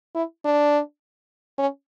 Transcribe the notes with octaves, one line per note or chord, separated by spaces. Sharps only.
E4
D4
C#4